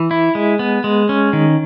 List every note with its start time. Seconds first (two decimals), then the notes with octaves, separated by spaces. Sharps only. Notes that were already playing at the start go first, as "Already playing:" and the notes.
Already playing: E3
0.11 E4
0.35 G#3
0.59 B3
0.84 G#3
1.09 C#4
1.33 D#3